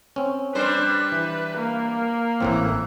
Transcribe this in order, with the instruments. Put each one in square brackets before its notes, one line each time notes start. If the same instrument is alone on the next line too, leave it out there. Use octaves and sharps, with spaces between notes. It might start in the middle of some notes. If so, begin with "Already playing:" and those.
[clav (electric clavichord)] C4 C#4
[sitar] G3 D4 C5 [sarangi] B4
[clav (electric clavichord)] E3
[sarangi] A#3
[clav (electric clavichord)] A1 A2 C4 [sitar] E3